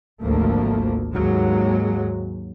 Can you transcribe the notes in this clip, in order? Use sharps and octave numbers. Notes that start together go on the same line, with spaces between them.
G#1 D2 F3 A3 A#3
D#2 G#2 F#3 G#3